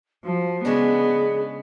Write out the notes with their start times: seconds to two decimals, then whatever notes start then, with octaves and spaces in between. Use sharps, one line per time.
0.24 F3 F#4
0.65 C#3 G#3 B3 D4 G#4